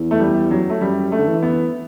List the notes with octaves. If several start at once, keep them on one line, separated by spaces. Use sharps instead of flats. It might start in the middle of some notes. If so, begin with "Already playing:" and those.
Already playing: E2
A3
G3
F#3
A3
F#2 G3
A3
D3
E3
B3